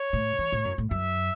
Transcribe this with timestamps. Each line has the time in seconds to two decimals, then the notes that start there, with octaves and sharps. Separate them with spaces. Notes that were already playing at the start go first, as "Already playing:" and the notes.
Already playing: C#5
0.13 A2
0.39 E3
0.52 A2
0.65 F#2
0.78 A2
0.91 F#2 E5